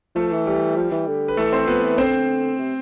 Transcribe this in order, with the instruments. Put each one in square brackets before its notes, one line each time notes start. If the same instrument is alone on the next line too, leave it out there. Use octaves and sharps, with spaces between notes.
[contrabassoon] F3 [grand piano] A3 A4
[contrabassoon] E3
[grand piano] G3 G4
[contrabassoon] F3
E3
D3
[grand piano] B4
[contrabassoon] E3 [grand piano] A3 A4
[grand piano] C4 C5
[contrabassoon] F3 [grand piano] B3 B4
[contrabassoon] E3
[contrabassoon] D3 [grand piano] C4 C5
[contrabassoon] C3